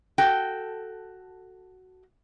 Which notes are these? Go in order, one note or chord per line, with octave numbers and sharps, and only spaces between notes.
F#4 A4 G5